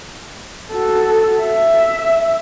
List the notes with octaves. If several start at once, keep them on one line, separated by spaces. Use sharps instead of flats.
F#4 A4
E5